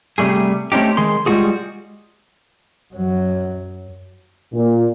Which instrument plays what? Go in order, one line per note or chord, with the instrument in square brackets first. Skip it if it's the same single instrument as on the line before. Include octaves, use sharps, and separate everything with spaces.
[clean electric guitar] C3 G3 A3 G#4
A3 C4 C#4 D#4 G4
D#3 G#3 G#4 C6
G3 G#3 C4 F4 F#4 G#4
[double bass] F#2 F#3
[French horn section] A#2